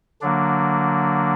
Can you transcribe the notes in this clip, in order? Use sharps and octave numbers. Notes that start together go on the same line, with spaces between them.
D3 F#3 A#3 D4